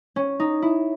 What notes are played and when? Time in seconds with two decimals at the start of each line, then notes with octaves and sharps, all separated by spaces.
0.16 C#4
0.40 D#4
0.62 E4